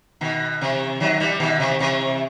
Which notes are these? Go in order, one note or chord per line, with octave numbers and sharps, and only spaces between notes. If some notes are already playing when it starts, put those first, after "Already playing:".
B2 D#3
C3 E3
D#3 F#3
E3 G3
B2 D#3
C3 E3
C3 E3